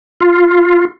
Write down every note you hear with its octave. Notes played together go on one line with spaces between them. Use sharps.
F4